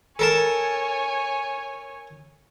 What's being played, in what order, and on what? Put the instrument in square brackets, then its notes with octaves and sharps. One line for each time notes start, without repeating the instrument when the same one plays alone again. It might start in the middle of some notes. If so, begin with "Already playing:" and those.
[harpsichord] A4 A#4 A5 [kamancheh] C#5 G#5